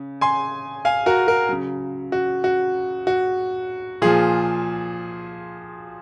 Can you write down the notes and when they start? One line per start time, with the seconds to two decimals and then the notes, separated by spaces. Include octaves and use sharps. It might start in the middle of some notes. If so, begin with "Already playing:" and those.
Already playing: C#3
0.21 G#5 C6
0.85 F5 G#5
1.06 F#4 A#4
1.28 F#4 A#4
1.49 C#3 F#3
2.12 F#4
2.44 F#4
3.07 F#4
4.02 A#2 F3 F4 G#4